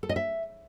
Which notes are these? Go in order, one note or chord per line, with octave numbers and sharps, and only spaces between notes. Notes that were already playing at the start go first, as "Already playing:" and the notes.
A4
D#5
E5